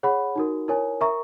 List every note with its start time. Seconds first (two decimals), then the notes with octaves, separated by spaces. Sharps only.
0.03 G#4 C#5 F#5 B5
0.36 D#4 F#4 A#4
0.68 E4 A#4 C#5 G#5
1.01 A#4 E5 A#5 C#6